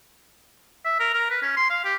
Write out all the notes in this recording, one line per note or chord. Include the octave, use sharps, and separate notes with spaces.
E5
A#4
A#4
B4
C#4
C6
F5
G4